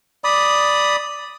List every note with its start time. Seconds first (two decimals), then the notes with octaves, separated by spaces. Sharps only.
0.24 D5 B5 D#6